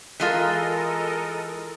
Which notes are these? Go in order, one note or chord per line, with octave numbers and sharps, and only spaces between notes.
E3 G#3 F4 A4 A#4 D#5